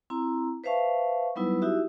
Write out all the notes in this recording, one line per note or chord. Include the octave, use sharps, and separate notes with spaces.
C4 E4 A#5
B4 C5 E5 F5 A5 C#6
F#3 G3 B3 D#4 E4 B4
D#4 E4 F#4 G4 E5